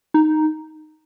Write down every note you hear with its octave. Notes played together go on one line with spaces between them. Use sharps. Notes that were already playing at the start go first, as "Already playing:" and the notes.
D#4